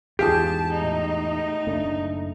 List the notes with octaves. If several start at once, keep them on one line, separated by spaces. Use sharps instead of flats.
E2 G#2 F4 G4 G#4 A5
A2 D#4
F#1 A3 D4